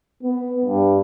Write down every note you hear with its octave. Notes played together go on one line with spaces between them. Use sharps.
B3
G2